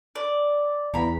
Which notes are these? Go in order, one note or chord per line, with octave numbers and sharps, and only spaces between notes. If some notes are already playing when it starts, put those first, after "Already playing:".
D5
E2 A#5 B5